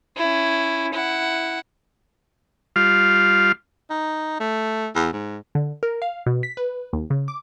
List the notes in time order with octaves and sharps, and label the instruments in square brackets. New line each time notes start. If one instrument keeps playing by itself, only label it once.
[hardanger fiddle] C#4 E4
E4 F#5
[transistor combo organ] G3 F4 F5
[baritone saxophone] D#4
A3
E2
G#2
[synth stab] D3
A#4
F5
B2
B6
B4
D#2
C#3
D6